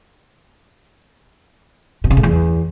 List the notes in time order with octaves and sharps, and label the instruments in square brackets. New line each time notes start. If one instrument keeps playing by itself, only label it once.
[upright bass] B2
C#3
A2
E2